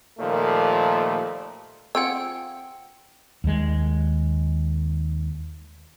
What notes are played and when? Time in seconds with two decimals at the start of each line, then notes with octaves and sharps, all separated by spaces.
0.18 D#2 A#2 F3 A3
1.95 C4 F4 G#4 F#5 G5 E6
3.44 D#2 G#3